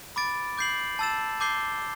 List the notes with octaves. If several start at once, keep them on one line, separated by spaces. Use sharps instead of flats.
B5 D6 A6 D7
D6 G6 C7 F#7
A5 E6 A6 E7
A5 D6 G6 C7 G7